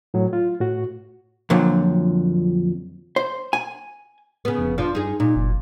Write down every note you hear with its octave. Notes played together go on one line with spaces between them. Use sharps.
A2 F#3
F4
A2 F#4
F2 A#2 D3 F3 F#3
C5
G#5
C#3 B3
F1
F3 D4 F4
G2 D#4 G#4
A#2 D#4
F#1